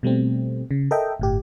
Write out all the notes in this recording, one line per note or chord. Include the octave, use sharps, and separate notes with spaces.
B2 G3 A3 C4
C#3
A4 A#4 D#5 E5 G5
G1 A2 G4